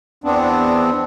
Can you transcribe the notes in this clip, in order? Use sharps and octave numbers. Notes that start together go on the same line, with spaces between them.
E2 B3 C4 D4